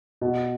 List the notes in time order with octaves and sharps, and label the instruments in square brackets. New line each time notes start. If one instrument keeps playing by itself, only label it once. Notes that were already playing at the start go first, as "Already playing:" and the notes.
[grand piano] B2